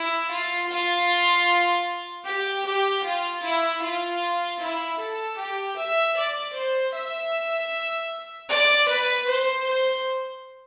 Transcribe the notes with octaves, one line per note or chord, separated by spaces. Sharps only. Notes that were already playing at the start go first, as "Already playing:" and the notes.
Already playing: E4
F4
F4
G4
G4
F4
E4
F4
E4
A4
G4
E5
D5
C5
E5
D5
B4
C5
C5